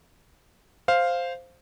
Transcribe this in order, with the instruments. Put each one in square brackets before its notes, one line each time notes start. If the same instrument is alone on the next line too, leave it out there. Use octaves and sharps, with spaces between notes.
[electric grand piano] C5 F5